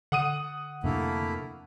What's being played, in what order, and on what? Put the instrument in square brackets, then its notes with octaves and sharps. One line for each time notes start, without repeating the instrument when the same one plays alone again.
[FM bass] D3 [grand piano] F#5 D#6 D#7
[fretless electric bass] F2 C3 D4 [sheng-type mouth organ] A3 A#3 E4